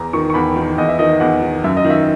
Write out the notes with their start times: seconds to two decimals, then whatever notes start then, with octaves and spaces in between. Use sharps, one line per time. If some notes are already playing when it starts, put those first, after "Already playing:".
Already playing: E2 A#5
0.13 D#3 C#6
0.30 C#6
0.34 E2 B5
0.56 D#3
0.78 E2 D#5
0.89 E5
0.99 D#3 D#5
1.20 E2 F#5
1.42 D#3
1.64 F#2 E5
1.77 D#5
1.85 D#3
1.90 E5